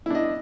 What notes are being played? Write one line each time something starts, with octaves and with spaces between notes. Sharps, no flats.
D4 E4 D#5